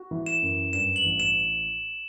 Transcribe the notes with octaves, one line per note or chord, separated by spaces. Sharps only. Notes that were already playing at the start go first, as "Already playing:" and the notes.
Already playing: F#4
E3
E7
F#2
G2 E7
F#7
A1
E7